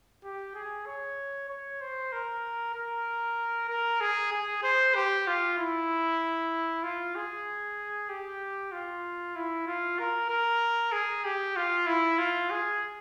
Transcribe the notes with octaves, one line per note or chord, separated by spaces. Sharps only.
G4
G#4
C#5
C#5
C5
A#4
A#4
A#4
G#4
G#4
C5
G4
F4
E4
F4
G#4
G4
F4
E4
F4
A#4
A#4
G#4
G4
F4
E4
F4
G#4